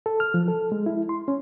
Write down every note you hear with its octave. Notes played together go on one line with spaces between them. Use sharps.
A4
F6
F3
A4
G#3
E4
C6
C#4